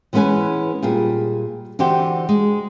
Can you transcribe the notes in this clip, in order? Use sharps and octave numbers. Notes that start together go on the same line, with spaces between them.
E3 G#3 B3 C#4 B4 G#5
A#2 G3 G#4
D3 E3 F#4 G4 C5 G5
G#3